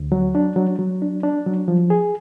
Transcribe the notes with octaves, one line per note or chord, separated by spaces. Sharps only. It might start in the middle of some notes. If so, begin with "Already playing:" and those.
Already playing: D2
F#3
D4
F#3
F#3
D4
D4
F#3
F3
G#4